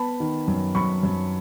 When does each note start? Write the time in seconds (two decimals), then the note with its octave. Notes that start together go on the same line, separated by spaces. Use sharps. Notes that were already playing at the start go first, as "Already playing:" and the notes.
Already playing: B3 A5 B5
0.20 D#3
0.48 F#2
0.75 F#2 B5 C#6
1.03 F#2